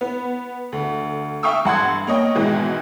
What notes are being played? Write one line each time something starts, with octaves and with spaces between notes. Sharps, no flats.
B3
D2
E5 F5 G5 C#6 D#6 E6
G2 F#5 C6 G#6
A#3 C#5 D#5 G5
G#2 B2 D#3 E3 G#3